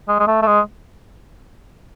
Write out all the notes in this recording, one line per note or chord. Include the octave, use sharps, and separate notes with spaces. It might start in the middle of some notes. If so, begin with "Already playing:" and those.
G#3
G#3
A3
A3
G#3